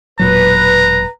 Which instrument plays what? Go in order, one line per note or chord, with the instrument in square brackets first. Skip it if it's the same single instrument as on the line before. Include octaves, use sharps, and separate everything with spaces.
[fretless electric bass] E1 A#2 F#3 [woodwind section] B4 [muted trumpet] A#5